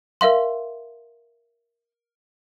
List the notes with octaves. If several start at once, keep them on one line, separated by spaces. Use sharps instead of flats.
A#4 E5 F5 C6